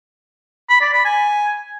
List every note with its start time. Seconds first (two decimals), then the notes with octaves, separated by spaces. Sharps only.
0.70 B5
0.82 D5
0.93 B5
1.05 G#5